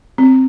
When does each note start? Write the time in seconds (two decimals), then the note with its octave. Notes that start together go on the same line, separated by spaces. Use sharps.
0.18 C4